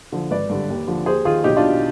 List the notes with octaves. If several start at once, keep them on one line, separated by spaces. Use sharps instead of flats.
D3 F3
G#1 B4 D5
G2 D3
D#2
D3 F3
D#2 G#4 C5
D#3 F4 G#4
B1 D#4 G4
D4 F4
B2